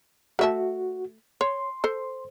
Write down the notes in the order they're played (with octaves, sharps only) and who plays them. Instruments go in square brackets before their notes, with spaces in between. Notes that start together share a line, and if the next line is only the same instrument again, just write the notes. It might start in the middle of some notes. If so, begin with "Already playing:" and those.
[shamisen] A3 E5 A5 [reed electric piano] F#4
[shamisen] C#5 [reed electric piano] C6
[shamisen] A4 C5